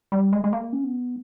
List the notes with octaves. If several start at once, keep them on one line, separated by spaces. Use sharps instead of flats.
G3
G#3
G#3
A#3
C#4
B3